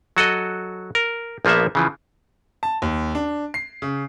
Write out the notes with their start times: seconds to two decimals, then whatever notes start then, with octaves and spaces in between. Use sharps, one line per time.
0.17 F#3 F#4 A4 D#5
0.95 A#4
1.45 A#1 F3 A#3 B3 E5
1.75 C#3 E3 F3
2.63 A5
2.82 D#2
3.15 D4
3.54 C7
3.82 C#3